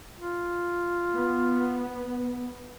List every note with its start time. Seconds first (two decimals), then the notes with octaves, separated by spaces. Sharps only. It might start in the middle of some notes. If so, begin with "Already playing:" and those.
0.18 F4
1.15 B3